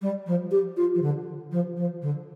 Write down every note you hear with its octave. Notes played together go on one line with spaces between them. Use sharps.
G3
F3
G4
F4
F3
D3
F3
F3
D3